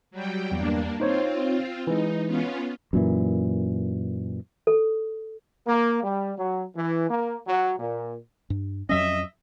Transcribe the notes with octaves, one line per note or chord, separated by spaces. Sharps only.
F#3 G3 G5
E2 G2 A#3 D4
C4 D#4 F4 C5 C#5
E3 G#3 D#4
B3 C#4 F4
F#2 A#2 E3
A4
A#3
G3
F#3
E3
A#3
F#3
A#2
G2
F2 F#3 C#4 D#5 E5